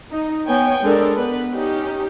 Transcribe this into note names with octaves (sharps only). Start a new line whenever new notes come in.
D#4
B3 C#5 G5 G#5
G#3 D4 A4 A#4 D5
B3 B4
C#4 D#4 G4